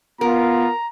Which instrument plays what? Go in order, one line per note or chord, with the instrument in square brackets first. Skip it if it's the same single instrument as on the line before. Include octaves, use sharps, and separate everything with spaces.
[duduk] B3 [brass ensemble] F4 [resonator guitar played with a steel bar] A#4 [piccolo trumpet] A#5